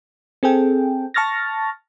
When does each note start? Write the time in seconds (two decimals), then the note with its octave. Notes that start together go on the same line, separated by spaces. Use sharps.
0.43 C4 G#4 A4 G5
1.14 A5 C#6 F6 A6 A#6